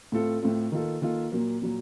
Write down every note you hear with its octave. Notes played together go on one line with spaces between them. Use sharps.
A2 A3 C4 F4 A4
A2 A3 C4 F4 A4
D#3 A#3 F4 A4
D#3 A#3 F4 A4
A#2 F#3 A#3
A#2 F#3 A#3